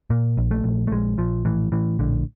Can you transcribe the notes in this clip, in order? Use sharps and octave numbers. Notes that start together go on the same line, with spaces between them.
A#2 A#3
A#1
A3
A#1
A3
A#1 G#3
A#1 F3
A2 E3
A2 E3
A#1 D3